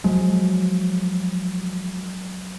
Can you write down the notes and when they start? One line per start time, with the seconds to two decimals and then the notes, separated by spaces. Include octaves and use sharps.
0.04 F3 F#3 G#3